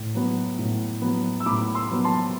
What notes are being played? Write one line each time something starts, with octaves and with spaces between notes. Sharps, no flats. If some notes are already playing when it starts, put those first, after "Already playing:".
Already playing: A2
F#3 B3
A2
F#3 B3
E6
A2 B5 D6
C6 E6
F#3 B3
A5 C6